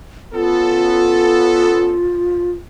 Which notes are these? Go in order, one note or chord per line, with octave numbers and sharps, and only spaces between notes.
B3 C#4 F4 A4